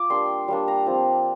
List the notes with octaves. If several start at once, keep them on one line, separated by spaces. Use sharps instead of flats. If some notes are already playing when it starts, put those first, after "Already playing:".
Already playing: F4 D6
G3 A#3 D4 C6
G3 A#3 D4
A#5
F3 C4 F4